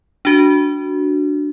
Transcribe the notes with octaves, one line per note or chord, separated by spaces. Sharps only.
D4 F#4